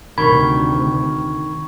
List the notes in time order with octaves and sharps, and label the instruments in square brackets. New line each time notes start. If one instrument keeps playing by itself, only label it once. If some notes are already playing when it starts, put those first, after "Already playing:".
[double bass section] D2 C3 [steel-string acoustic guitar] D#3 [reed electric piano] B5 [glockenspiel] C#6 G#6